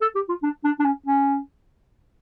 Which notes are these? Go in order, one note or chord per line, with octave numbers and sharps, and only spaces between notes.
A4
G4
F4
D4
D4
D4
C#4
C#4